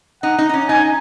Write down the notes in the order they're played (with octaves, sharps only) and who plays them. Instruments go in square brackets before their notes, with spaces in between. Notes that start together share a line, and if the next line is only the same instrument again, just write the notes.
[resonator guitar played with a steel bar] D#4 [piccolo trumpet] F#5
[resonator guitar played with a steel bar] D#4
D#4
C#4
[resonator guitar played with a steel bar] D#4 [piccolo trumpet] G#5